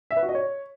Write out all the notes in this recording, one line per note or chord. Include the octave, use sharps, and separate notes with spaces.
E5
B4
F#4
D#5
C#5